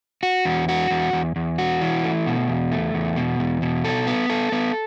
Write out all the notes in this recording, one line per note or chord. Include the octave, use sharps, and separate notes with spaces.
F#4
E2
F#4
E2
E2
E2
F#4
E3
A3
B2
E2
A3
E2
B2
E2
B2
A4
B3
A4
B3